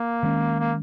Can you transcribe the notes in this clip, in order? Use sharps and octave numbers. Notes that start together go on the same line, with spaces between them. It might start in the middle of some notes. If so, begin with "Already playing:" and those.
Already playing: A#3
D#3 G#3 C#4
A#3